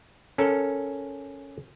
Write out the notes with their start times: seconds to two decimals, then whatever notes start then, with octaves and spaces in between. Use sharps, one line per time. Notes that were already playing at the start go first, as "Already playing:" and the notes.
0.38 C#4 A4 A#4 C#5